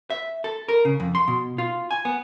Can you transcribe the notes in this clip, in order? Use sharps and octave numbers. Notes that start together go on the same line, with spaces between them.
E5
A4
A#4
C#3
F2
C6
B2
F4
G#5
B3